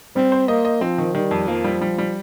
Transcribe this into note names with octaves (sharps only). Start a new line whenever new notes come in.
G3 C4
C5
A#3 D#5
D#5
F3 C4
D#3
D#3 G3
F2
F3 A#3
G3
G3
G3